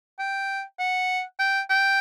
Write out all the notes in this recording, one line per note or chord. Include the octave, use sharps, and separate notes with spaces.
G5
F#5
G5
G5